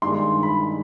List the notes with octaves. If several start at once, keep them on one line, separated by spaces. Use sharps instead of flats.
G2 D#3 G#3 C6
B5